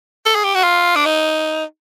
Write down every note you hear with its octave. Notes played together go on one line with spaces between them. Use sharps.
A4
G#4
G4
F#4
F4
D4
D#4